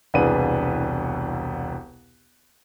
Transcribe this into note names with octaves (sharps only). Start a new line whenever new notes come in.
E1 C2 D4 G#4 B4 D#7